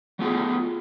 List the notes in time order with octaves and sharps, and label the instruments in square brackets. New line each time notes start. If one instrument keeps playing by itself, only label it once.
[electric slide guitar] F#3 A3 B3 F4 G#4